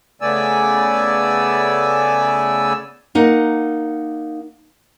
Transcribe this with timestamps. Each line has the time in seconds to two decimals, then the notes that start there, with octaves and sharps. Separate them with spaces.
0.21 C#3 A3 B3 D5 G#5 E6
3.15 A#3 D#4 F#5